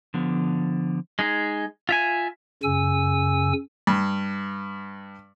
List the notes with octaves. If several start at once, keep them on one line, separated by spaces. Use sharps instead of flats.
D3 F3 B3
G#3 D#4 G#4
F4 E5 G#5
F#2 C#3 G#5 E6
G2